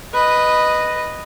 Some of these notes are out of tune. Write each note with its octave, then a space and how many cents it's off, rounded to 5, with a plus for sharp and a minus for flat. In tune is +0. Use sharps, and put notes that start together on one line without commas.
B4 +0 D#5 -5